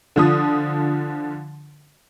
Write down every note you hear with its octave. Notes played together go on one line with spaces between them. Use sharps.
D3 F3 D#6